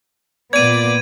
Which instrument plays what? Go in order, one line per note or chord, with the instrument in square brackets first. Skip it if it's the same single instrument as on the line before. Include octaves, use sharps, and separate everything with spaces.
[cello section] A#2 B3 [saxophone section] D5 [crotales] G#6 D#7